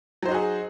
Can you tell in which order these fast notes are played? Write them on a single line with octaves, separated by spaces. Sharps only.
F#3 C5 D#4 F#4 G#4